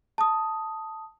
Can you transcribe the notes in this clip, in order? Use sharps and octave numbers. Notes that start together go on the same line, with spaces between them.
A5 D#6